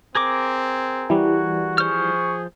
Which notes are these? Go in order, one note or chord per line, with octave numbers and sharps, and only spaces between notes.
C4 G#4 A#4 D6
E3 G3 F#4
F3 G#4 C5 C#6 F6